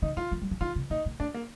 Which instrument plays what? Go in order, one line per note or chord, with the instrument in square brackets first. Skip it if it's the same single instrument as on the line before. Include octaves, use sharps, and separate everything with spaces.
[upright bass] D3 [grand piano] D#4
[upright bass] D#3 [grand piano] F4
[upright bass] F3
G3
F3
[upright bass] D#3 [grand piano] F4
[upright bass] C3
[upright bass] A#2 [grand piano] D#4
[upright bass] A#2
[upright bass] A2 [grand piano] D4
[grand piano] A#3